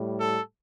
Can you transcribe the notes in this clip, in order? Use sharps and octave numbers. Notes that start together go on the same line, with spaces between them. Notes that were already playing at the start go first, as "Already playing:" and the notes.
Already playing: A2 G3
A4